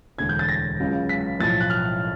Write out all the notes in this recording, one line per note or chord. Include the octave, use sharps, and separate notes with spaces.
E1 D2 D3 G#6
G6
A6
A#6
C#2 C#3 F#3
B6
B1 A2 F3 A6
F#6
F6